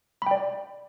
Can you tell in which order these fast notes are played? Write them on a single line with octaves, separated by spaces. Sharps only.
B5 G5 D5